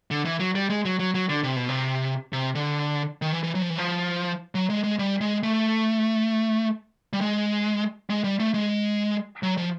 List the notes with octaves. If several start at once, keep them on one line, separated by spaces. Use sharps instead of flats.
D3
E3
F#3
G3
G#3
F#3
F#3
F#3
D3
C3
B2
C3
C3
D3
D#3
E3
E3
F#3
F3
E3
F3
F#3
G#3
G#3
G3
G#3
A3
G3
G#3
G#3
G3
A3
G#3
F#3
F3